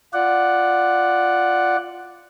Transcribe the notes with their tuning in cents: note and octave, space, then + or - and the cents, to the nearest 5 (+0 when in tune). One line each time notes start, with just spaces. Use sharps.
F4 -5 D5 +0 F#5 +0